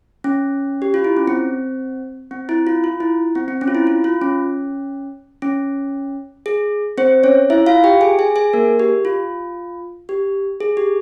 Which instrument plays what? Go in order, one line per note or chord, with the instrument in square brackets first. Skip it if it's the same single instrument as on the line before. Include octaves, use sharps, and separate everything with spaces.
[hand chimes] C#4
G4
F4
E4
C#4
C4
C4
E4
F4
F4
E4
C4
C4
C#4
F4
E4
F4
F4
C#4
C#4
G#4
C4 C5
C#4 C#5
E4 E5
F4 F5
G4 G5
G#4 G#5
G#4 G#5
G#4 G#5
A#3 A#4
G4
F4
G4
G#4
G4